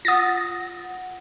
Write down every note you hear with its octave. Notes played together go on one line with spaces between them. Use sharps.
F4 F#5 D#6 A6 A#6